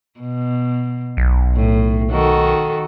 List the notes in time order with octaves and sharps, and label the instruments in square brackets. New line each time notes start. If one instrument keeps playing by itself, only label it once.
[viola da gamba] B2
[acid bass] B1
[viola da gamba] A2
D#3 F#4 A4